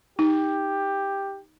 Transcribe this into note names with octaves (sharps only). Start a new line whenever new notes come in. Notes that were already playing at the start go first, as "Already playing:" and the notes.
D#4 G4